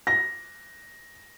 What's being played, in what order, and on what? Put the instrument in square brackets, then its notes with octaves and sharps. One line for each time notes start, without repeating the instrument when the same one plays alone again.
[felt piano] A#6